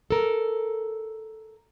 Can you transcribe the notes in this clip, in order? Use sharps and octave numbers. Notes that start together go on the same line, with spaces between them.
A4 A#4